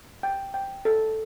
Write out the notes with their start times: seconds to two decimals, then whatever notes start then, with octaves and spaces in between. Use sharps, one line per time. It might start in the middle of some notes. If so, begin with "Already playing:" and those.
0.23 G5
0.54 G5
0.85 A4